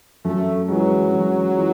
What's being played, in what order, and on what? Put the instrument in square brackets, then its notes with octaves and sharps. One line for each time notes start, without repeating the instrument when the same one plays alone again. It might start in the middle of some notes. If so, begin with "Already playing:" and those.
[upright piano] F#2 [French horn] A3
[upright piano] E3 G#3 [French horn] F#3
[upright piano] F#2
E3 G#3